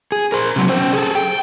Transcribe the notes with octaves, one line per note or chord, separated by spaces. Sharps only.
G#4
A#4 C5
C3 F#3
C#4 C5
G#4 A4
G5